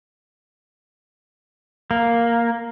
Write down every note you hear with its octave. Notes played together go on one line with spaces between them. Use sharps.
A#3